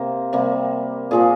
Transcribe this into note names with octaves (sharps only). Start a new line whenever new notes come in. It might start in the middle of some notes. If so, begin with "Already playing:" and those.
Already playing: C3 A#3 A#4 C5
C3 G3 A#3
A#2 F3 A#3 G#4